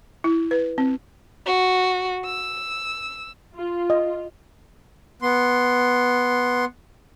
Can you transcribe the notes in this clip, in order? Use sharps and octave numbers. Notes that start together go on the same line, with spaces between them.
E4
B4
C4
F#4
E6
F4
D#5
B3 C6